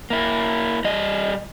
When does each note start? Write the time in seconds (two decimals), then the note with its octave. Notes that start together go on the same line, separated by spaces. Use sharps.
0.10 A#3 E4
0.85 G3 D#5